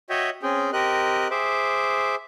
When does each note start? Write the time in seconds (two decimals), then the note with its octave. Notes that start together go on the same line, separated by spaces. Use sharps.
0.10 F#4 C#5 D#5 E5 G5
0.43 C4 C#4 G#4 G5
0.73 C4 G4 A#4 D#5 F#6
1.31 G#4 C5 E5 D6